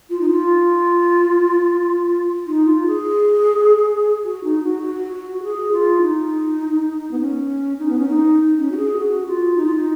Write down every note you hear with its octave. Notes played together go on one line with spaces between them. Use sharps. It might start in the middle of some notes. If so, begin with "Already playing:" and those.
F4
D#4
F4
D#4
F4
G#4
F#4
D#4
F#4
F#4
F#4
F#4
G#4
F4
D#4
B3
C#4
D#4
B3
C#4
D#4
C#4
F#4
G#4
F#4
F4
D#4
F4
D#4